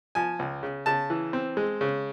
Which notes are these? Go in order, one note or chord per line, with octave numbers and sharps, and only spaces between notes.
F3 G#5
C#2
C#3
C#3 A5
E3
C4
G#3
C#3